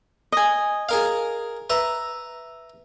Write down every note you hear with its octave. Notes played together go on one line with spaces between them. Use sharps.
D#5 G#5
G#4 A#4 F5
B4 E5 A#5